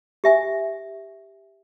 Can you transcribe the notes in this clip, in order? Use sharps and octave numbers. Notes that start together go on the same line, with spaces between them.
G4 E5 G#5